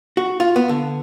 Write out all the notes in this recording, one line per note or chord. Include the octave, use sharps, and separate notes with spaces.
F#4
F4
B3
D3